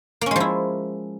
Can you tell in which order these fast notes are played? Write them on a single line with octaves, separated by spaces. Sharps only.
A#3 C#4 G#3 F3 E4